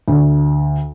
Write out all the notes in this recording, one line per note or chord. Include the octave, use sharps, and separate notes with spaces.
D2